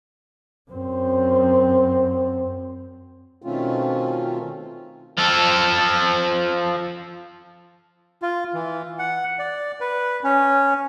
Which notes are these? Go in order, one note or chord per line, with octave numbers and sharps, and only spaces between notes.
F#2 C4
B2 D#3 A3 C4 C#4 F4
F3 A4
F4
E3
F#5
D5
B4
C#4